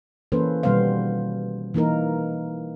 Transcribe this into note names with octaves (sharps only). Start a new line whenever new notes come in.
E3 A#3 C#4 A4 B4 C5
B2 D#3 G3 B3 C5 F5
E3 A#3 D#4 A#4